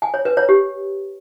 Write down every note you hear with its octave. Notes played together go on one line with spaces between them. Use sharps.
G#5
C#5
B4
C#5
G4